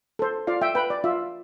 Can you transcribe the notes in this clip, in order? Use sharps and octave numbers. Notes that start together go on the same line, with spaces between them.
A4 C5
F4 D5 F5
E5 G5
B4 G5 B5
D5
F4 E5